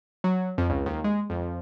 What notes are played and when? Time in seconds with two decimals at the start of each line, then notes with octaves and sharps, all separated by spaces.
0.24 F#3
0.58 F2
0.70 C#2
0.86 D#2
1.04 G#3
1.30 F2